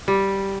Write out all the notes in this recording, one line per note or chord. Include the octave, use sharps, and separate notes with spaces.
G3